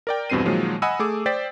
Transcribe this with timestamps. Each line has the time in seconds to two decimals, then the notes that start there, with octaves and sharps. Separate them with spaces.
0.07 A#4 D5 G5
0.30 E2 G2 B2 C4 C7 D#7
0.45 A#2 D#3 F3 F#3 G#3 A#3
0.82 D#5 F#5 G#5 B5 D#6 E6
0.99 A3 G#4 D6
1.26 C5 D5 G5 A6 B6